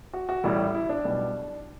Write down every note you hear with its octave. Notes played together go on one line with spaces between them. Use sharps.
F#4
F#4
A1 A2 G3 E4
E4
D4
B1 B2 G3